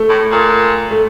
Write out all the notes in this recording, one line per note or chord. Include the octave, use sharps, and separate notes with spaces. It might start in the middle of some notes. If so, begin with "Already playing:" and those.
Already playing: A3
A2
A#2
A3